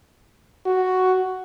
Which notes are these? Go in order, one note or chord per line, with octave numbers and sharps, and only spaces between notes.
F#4